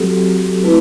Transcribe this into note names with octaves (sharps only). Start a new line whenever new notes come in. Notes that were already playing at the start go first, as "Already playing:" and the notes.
Already playing: F#3 C4 F#4 G4 A4
A3 C4 E4 B4